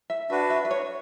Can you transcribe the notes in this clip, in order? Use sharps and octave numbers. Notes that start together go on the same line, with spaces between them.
E5
D4 F#4 B4 E5
E5
B4
C#5